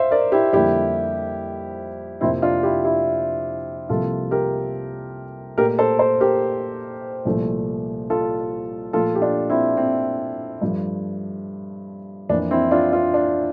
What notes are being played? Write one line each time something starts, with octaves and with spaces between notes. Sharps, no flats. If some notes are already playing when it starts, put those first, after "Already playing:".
Already playing: C5 E5 F5
A#4 D5
E4 G4
F2 D3 G3 A#3 E4 G4
F2 C3 F3 A#3 C4 E4
D4 F4
E4 G4
E4 G4
C2 C3 F3 A#3 F4 A4
G4 A#4
A#2 A3 G4 A#4
A4 C5
A4 C5
G4 A#4
C2 A#2 F3 A3
F4 A4
A#2 F3 A3 F4 A4
G4
D4 F4
C4 E4
C4
G2 F3 A3
F2 E3 A#3 D4
C4 E4
D4 F4
D4 F4
D4